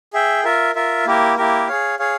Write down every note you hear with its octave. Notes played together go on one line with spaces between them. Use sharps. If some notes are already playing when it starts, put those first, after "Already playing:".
G#4 E5 G5
F4 A#4 E5
F4 A#4 E5
A#3 E4 G4 A#4
A#3 E4 G4 A#4
G#4 C#5 F5
G#4 C#5 F5